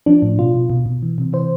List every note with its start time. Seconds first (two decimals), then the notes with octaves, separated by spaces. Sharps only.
0.06 F3 D4
0.22 A2
0.39 B2 F4
0.54 B2
0.70 B2
0.86 B2
1.02 E3
1.18 C3
1.33 E3 C5